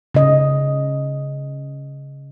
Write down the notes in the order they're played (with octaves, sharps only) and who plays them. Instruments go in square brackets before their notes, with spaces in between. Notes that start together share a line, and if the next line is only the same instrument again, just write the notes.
[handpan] C#3 C#4 D#5